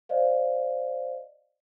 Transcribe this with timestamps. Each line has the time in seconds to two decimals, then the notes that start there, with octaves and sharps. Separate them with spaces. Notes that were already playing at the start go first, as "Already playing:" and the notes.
0.09 C5 D5 D#5 F5